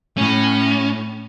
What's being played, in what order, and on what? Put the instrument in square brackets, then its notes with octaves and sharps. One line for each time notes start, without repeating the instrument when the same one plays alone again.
[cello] A2 [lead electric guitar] C#4